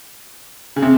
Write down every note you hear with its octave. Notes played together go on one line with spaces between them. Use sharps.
C#3
C3